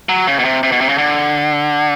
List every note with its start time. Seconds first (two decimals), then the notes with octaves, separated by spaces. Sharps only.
0.09 F#3
0.27 C#3
0.39 B2
0.45 C3
0.63 C3
0.72 B2
0.81 C3
0.89 C#3
0.98 D3